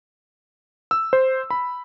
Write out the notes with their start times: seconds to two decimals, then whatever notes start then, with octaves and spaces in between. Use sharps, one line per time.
0.91 E6
1.13 C5
1.50 B5